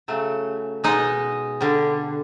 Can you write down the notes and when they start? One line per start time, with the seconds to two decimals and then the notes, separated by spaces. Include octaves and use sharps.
0.08 C#3 F#3 A3
0.84 B2 G#3 D#4 D#5
1.61 D3 G3